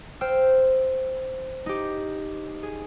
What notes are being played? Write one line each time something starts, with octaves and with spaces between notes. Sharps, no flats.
C5 G5 E6 F6
D#4 G4
G#4